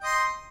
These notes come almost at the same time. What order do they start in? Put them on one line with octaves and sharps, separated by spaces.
G5 D#5 C6